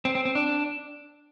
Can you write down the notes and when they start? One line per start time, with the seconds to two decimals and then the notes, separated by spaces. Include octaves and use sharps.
0.05 C4
0.15 C4
0.25 C4
0.35 D4